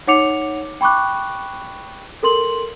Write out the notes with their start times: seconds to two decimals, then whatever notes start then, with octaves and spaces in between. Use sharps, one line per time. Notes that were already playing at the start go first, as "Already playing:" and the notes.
0.07 D#4 C#5 F#5 D6 C#7 F7
0.81 G5 B5 C#6 D6 F#6
2.23 A4 A#4 C6 F#7